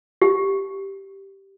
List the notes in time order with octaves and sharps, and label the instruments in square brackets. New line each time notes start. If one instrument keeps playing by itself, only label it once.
[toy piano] G4